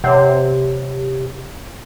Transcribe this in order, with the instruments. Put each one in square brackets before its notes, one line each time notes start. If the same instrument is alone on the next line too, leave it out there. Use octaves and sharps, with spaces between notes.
[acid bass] C3 [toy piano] C#5 F#5